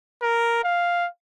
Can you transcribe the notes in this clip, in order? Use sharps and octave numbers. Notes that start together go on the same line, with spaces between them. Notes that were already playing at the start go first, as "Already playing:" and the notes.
A#4
F5